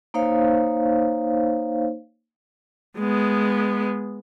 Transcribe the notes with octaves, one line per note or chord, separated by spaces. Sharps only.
A#3 D#4 C5 C#5 F5
G#3 B3